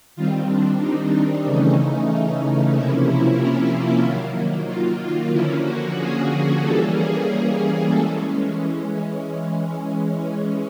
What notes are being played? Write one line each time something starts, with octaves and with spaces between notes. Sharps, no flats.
D#3 G3 C4 F4
D4
D#4
D4
C#3 E3 A3 C#4 D#4
C3 F3 A#3 C#4 E4
E4
F4
D#3 F#3 A#3
F4
F4
D3 F3 A#3 C#4 E4
F#4
G#4
E3 G3 A#3 C#4 A4
G#4
E3 G#3 C#4 A4